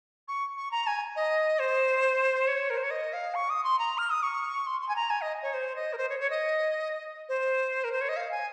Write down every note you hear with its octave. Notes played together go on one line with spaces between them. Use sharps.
C#6
C#6
A#5
G#5
D#5
C5
C#5
A#4
C5
C#5
D#5
F5
C#6
D#6
C6
A#5
F6
D#6
C#6
C6
C6
G#5
A#5
G#5
D#5
C#5
C5
D#5
A#4
C5
C#5
C#5
D#5
C5
A#4
C5
C#5
D#5
F5
G#5